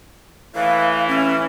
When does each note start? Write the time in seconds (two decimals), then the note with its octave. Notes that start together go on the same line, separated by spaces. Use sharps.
0.55 A2 E3 F5
1.08 C#4